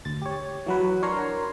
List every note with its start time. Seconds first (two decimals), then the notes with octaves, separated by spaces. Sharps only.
0.05 D2 A6
0.22 G4 C#5
0.66 E3 F#3 B4
1.02 D4 A#4 C#5 A#5 C6